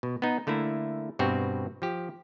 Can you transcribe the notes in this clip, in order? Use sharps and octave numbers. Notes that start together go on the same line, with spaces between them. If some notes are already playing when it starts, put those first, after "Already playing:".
B2
B3 D#4
D3 A3 A#3 E4
G2 B2 C4 F#4 G4
F3 G4